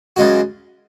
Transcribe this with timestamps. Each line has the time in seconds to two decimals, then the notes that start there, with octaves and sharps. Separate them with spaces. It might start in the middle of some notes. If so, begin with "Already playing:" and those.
0.16 F#2 C#3 G#3 F#4